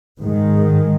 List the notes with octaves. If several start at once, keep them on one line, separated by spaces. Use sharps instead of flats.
G#2 D#3 G#3